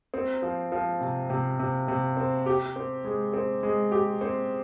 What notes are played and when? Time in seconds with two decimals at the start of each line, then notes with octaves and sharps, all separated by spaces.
0.14 C4
0.42 F3
0.72 F3
1.01 C3
1.30 C3
1.59 C3
1.88 C3
2.17 C4
2.46 G4
2.76 C4
3.04 G#3
3.34 C4
3.63 G#3
3.92 G4
4.21 C4